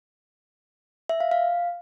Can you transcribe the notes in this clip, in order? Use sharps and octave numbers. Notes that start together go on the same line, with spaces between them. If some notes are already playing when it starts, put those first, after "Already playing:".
E5
F5
F5